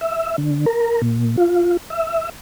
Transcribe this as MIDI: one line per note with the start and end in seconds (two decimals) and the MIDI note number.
0.01 0.36 76
0.38 0.66 50
0.66 1.02 70
1.02 1.36 46
1.37 1.77 65
1.90 2.29 76